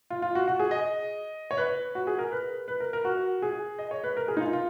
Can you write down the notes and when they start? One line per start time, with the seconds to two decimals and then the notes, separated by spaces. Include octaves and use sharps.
0.10 F4
0.22 F4
0.35 F#4
0.48 F#4
0.59 G#4
0.71 D#5
1.51 C#5
1.57 B4
1.95 F#4
2.07 G#4
2.19 A#4
2.32 B4
2.68 B4
2.80 A#4
2.93 A#4
3.05 F#4
3.42 G#4
3.79 D#5
3.91 C#5
4.04 B4
4.17 A#4
4.28 G#4
4.37 D#4
4.41 F4
4.53 F4